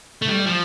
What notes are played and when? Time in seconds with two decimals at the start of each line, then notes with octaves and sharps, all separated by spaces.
0.22 A3
0.29 G3
0.46 F3